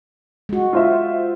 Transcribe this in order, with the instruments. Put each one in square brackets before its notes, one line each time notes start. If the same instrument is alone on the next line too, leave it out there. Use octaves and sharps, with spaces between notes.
[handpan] G#3 F#4
[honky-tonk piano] F4 C5 E5